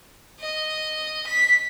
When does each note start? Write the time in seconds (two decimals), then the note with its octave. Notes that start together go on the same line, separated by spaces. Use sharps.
0.40 D#5
1.27 B6